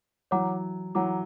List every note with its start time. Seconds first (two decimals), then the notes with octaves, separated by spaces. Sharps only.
0.31 E3 F#3 C#5 F#5 A#5 D6
0.95 E3 F#3 C#5 F#5 A#5 D6